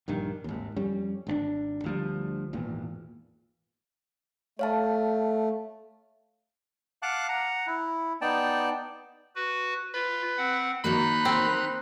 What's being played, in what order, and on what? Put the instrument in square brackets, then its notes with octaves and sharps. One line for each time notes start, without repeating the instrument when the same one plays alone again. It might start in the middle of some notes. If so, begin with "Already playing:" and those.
[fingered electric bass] A#1 G2 D#3
G#1 D#2
F2 G3 C#4
G#1 C4 D4
D2 F3 G3
G#1 E2 A#2
[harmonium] A3 [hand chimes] C#5 F5 A5
[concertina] F5 F#5 A5 D6 F#6
F#5 A#5
E4
B3 D#4 D5 G5 A5
[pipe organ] F#4 B4
[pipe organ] F4 [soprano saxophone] B4
[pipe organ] C4 F#5
[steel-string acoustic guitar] D#3 F#3 A#3 [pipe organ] D#4 F#6 [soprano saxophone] B5
[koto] C4